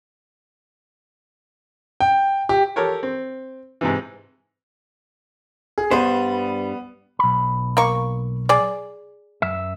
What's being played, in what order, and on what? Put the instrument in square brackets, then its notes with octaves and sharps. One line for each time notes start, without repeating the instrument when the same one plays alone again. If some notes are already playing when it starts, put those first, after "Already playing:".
[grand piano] G5
G4
[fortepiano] G4 A4 A#4 C#5
C4
G#2 C3 E3
[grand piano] G#4
[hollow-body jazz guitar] G2 G3 C5 [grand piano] B3
[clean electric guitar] B1 B5
[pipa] A#3 C#6
G#4 D5
[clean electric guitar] F#2 E5